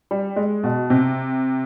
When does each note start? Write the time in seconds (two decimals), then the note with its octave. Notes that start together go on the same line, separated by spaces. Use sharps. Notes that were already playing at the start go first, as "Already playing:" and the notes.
0.11 G3
0.36 G#3
0.64 B2
0.90 C3